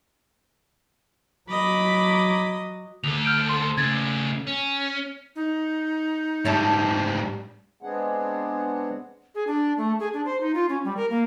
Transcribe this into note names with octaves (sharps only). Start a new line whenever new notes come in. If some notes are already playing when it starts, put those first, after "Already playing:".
F#3 D#5 B5 D6
D2 A4 F7
F6 G6 D7
C6
C#3 A3 G#6 A6
C#4
D#4
G#2 G3 C#5 E5 A5
G#3 B3 C4 D4 G#4 F#5
G#4
D4
A3
G#4
D4
C5
D#4
F4
C#4
G3
A#4
A#3